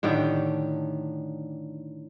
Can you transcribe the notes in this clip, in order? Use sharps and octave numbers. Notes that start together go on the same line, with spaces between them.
A2 D3 D#3 G4